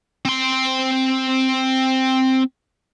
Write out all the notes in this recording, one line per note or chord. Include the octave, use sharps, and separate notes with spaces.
C4 C6